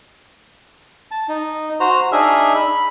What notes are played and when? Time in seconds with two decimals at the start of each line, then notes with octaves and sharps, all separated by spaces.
1.11 A5
1.28 D#4
1.80 F#4 C5 A#5
2.12 D4 D#4 G#4 E5 F6
2.55 B5